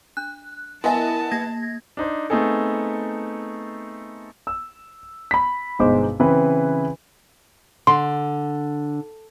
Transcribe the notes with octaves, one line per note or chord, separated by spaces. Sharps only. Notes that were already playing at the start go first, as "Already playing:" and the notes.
D4 F#6
B3 E4 A#4 D#5 E5 G#5 A5 C6
A#3 G#6 A#6
D4 D#4 C5
A3 B3 C4 D#4 G#4 A4
E6
B5 B6
G1 B2 G#3 D#4 C5 D6
C#3 E3 C4 B4
D3 C6